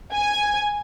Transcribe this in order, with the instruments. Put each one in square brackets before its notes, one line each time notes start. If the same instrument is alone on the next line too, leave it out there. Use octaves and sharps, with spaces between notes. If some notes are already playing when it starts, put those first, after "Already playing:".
[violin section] G#5